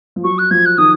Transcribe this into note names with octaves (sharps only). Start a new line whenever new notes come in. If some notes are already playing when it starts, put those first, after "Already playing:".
F3
F#3 C#6
F#6
F3 G#6
F#6
D#3 D#6